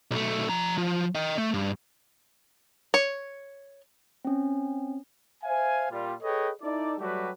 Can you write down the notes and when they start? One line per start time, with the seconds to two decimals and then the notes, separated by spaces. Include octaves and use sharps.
0.11 B1 A3
0.49 F3 A#5
0.78 F3
1.15 D#5 G5
1.38 A3
1.54 G2
2.94 C#5
4.25 C4 C#4
5.44 C5 E5 F5 G#5
5.90 A#2 G3 F4
6.23 G#4 A4 B4 C#5 D#5 G5
6.62 D#4 E4 A4 D5
6.99 F#3 G3 A3 F#4 G4 B4